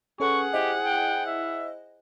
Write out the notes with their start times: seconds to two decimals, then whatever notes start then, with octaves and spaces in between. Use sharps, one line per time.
0.20 C#4 G#4 A4 B4 F#5 C#6
0.53 E4 G4 C5 D#5
0.85 G5
1.26 E5